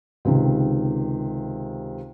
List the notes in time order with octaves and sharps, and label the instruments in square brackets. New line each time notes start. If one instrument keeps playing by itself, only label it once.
[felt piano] C#2 C3 D#3